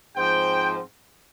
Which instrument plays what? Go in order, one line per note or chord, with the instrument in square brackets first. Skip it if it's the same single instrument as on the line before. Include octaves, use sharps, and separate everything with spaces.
[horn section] G#2 F3 C4 G5